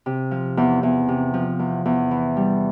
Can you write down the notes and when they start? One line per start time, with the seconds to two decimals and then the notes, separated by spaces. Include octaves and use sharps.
0.06 C3
0.31 F3
0.57 E2
0.83 E2
1.08 C3
1.34 F3
1.59 E2
1.85 E2
2.11 E3
2.37 G3